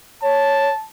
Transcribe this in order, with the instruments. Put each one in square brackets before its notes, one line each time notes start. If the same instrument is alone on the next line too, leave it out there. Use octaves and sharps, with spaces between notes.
[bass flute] C#5 [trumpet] A5